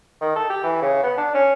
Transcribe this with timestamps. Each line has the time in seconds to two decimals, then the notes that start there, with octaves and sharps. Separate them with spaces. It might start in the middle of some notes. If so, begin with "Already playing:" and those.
0.21 D#3
0.35 A4
0.49 G4
0.63 E3
0.82 C#3
1.03 B3
1.17 D4
1.34 C#4